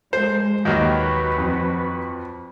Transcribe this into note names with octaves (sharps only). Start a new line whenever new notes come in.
G#3 A4 C5
D#2 D#3 F#3 A#3 F#4 B4 D#5
F2